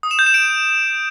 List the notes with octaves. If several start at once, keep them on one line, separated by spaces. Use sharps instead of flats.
D#6
E7
G6
E7
D7